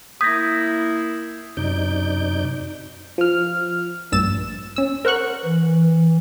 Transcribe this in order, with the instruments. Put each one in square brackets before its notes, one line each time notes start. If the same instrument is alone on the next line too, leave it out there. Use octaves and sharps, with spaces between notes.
[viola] A#3 E4 [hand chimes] D#6 A#6 [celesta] G6 G#6 B6
[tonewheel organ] F#2 C3 D#4 D5 G6
[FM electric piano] F3 F6
[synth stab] A#1 G2 E6 A6 E7
C#4 E6
A#4 C5 F#5 C#6 F#6
[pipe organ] E3